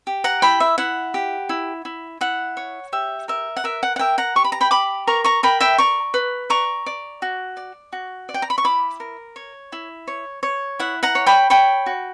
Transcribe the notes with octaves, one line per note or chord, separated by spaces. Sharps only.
G4
F#5 A#5
E4 G5 B5
E5
E4 F#5
G4
E4
E4
E4 F#5
C#5
G4 E5
A#4 E5
F#5
A#4 E5
F#5
F#5
A#4 E5 G5
F#5 A#5
G4 C#6
B5
A#5
G5 B5
G4 B5 D6
A#4 A#5 C#6
A#5 C#6
A#4 G5 B5
E5 G5
D5 A#5 C#6
B4
D5 A#5 C#6
D5
F#4
D5
F#4
D5
G5
A#5
B5
C#6
E4 B5 D6
A#4
C#5
E4
C#5
C#5
E4 F#5
F#5 A#5
C#5
G5 B5
C#5 G5 B5
F#4